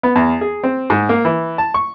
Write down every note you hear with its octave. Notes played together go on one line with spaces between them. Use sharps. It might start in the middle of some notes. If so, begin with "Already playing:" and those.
B3
E2
G#4
C4
G#2
A#3
E3
A5
C#6